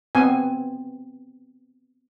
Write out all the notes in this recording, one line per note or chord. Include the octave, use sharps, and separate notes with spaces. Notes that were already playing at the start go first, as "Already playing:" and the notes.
B3 C4 G#5